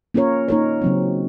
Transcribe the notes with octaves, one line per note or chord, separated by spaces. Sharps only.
A#3 C#4 F4 A#4 C#5
A#3 D#4 A#4 C#5
C#3 F#3 C4